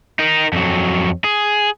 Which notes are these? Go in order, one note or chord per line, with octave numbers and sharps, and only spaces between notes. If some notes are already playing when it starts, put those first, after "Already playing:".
D#4 A#4
F2 F#3
G#4